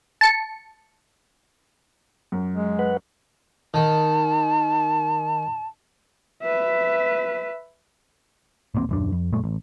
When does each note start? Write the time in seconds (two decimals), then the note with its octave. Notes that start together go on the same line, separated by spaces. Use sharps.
0.21 A5 C#7
2.32 F#2
2.54 G#3
2.79 B4 F#5
3.74 D#3 A5
6.43 B4 E5
8.75 D#1 A1 A#3 C4
8.89 D#1 F#2 D4
9.12 F2
9.32 F#2 A#2 G#3 A3
9.44 A1